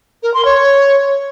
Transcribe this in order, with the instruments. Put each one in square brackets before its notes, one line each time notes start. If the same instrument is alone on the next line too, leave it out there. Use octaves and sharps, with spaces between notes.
[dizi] A#4
C6
C#5